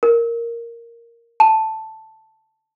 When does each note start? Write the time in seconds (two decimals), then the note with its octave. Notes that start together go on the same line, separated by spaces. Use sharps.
0.03 A#4
1.40 A5